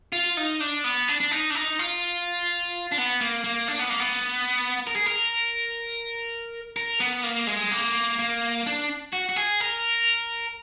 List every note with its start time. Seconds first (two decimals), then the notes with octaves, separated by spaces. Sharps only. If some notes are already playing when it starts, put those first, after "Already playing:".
0.12 F4
0.37 D#4
0.60 D4
0.84 B3
1.08 D4
1.20 D4
1.31 D#4
1.50 D4
1.55 D#4
1.79 F4
2.92 D4
2.98 B3
3.21 A#3
3.44 A#3
3.68 D4
3.79 B3
3.90 A#3
4.00 B3
4.87 A#4
4.96 G#4
5.06 A#4
6.76 A#4
7.00 B3
7.24 A#3
7.47 G#3
7.71 A#3
8.19 A#3
8.66 D4
9.13 F#4
9.29 F#4
9.36 G#4
9.60 A#4